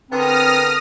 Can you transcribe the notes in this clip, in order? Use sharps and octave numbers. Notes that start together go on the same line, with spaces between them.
D3 B3 C4 A#4 D#6 F6 A#6